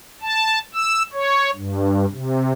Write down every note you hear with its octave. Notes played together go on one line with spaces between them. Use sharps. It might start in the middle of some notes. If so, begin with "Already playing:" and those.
A5
E6
C#5
G2
C3